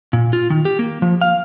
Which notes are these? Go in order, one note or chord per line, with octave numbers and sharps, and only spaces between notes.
A#2
F4
D#3
G4
A#3
F3
F5